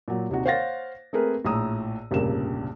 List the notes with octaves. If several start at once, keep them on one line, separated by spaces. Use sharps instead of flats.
A#2 F#3
D#1 C3 D#4 F#4
C5 C#5 F5 F#5 A6 A#6
A3 A#3 C4 G#4 A#4 B4
A#1 A2 A#5 D#6 E6
F1 A#1 G2 C#3 A#3 E7